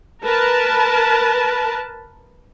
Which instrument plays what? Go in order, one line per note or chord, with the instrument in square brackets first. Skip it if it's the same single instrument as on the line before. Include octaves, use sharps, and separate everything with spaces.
[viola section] A#4 B4 A5